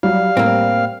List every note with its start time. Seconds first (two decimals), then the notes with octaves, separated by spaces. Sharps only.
0.03 F#3 G3 F5
0.37 A2 A#3 C4